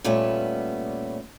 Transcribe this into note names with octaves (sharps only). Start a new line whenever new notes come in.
A#2 G3 A3 B3 C#4